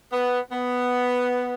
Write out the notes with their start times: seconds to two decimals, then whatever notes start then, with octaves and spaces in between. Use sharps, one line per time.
0.12 B3
0.51 B3